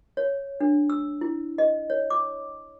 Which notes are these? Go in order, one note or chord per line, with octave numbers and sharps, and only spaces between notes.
C#5
D4
E6
E4
D#5
C#5
D6